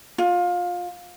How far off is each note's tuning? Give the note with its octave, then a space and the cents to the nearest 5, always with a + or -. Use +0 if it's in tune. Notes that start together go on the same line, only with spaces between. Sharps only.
F4 +20